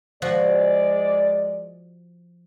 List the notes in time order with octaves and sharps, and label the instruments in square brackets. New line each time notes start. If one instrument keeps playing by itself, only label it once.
[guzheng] F3 F#4 [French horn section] G#3 D5